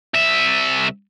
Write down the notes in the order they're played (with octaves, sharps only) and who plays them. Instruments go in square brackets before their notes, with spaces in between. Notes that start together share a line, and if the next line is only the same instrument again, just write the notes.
[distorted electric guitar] C2 E5